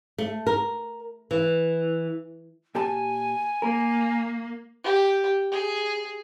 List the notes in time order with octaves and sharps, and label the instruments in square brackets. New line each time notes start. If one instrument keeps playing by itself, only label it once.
[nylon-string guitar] A3
A#4
E3
[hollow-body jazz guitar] A#2 G4 A5 [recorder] G#5
[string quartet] A#3 [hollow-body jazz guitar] A#4
[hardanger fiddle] G4
G#4